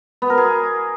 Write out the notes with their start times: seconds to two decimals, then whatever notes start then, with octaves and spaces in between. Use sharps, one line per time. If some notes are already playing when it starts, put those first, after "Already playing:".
0.22 B3
0.30 A#4
0.38 G#4